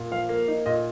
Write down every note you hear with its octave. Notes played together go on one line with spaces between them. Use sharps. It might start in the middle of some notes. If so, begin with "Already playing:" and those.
Already playing: A#2
F3 F5
A#3
D#4
A#2 D#5